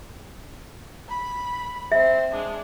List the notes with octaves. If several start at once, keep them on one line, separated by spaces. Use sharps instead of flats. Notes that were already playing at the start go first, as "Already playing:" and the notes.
B5
C4 C5 E5
G#3 D4